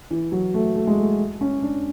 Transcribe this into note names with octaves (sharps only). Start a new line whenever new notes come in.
E3
F#3
A3
A3
G#3
A3
C#4
D4